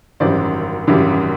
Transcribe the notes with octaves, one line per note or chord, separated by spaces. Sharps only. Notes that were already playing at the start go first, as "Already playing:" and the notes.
G#1 F#2 C#3 E3 G3 C5 D5
G#1 F#2 C#3 E3 G3